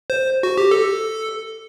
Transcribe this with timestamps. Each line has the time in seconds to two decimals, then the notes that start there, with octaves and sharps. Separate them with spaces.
0.10 C5
0.43 F#4
0.58 G4
0.71 A4